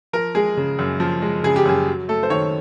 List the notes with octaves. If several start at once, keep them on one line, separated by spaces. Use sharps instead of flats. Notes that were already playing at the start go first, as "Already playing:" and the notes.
F3 A#4
G#3 G#4
C#3
F#2
F3
G#3
C#3 G#4
G4
F#2 G#4
F#3
A3 A4
C5
D#3 C#5